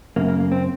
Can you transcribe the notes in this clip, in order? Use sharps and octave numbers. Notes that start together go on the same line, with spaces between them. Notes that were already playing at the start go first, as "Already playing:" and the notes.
F#2 C#3 A#3
A#3
A#3
C4